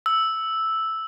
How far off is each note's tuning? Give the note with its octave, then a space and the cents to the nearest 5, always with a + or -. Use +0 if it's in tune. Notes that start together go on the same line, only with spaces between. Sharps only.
E6 -5